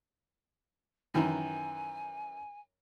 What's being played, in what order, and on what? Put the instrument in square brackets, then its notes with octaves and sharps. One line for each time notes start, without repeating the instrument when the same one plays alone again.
[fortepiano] F#2 D#3 E3 [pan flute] G#5